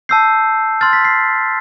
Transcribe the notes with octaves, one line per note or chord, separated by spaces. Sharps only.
A5 E6 G6 C7
C6 F6 A6
B6
C7